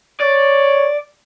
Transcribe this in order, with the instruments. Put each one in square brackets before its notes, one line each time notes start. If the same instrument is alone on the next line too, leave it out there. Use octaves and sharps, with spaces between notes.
[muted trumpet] C#5 [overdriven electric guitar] D5